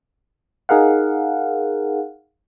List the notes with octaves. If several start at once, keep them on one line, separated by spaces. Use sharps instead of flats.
D#4 G#4 A#4 F5 F#5